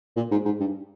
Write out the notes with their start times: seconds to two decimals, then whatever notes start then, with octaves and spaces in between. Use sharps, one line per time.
0.16 A#2
0.31 G#2
0.45 G#2
0.60 G2